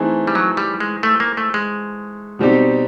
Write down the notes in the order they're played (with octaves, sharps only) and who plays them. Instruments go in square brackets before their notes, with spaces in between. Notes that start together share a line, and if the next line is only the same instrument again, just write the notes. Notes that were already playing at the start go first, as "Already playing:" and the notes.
Already playing: [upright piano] E3 A3 C4 D#4 G#4
[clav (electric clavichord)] G3
F#3
G3
G#3
A3
A#3
A3
G#3
[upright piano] B2 G3 C4 D#4 G4